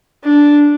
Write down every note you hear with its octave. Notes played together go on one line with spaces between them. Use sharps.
D4